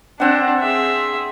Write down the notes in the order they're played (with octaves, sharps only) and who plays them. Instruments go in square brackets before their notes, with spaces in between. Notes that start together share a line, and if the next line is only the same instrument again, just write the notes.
[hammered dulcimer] C4 F#5 [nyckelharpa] D4
[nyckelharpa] G#4 E5